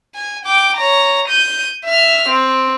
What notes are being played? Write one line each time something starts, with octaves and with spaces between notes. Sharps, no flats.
G#5
G5 D6
C#5 A#5
G6 D#7
E5 F6
C4